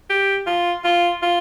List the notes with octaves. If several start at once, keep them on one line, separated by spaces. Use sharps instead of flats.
G4
F4
F4
F4